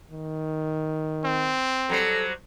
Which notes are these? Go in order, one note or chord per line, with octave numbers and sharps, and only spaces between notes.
D#3
C4
F#3 G3 A4 C5